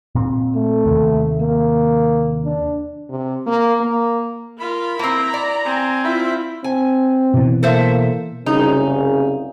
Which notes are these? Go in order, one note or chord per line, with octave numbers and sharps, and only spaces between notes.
A#2 C4
A3
D#2 C3 D#3
A#3
D4
C3
A#3
A#3
F4 A#4 B5
A#3 C4 E4 A#5
D5
C4 G#5
E4 F4 C5 E5 B5
C4 G#5
B2 E3
A#3 A4 C5 E5
F#1 C2 C#3 D#4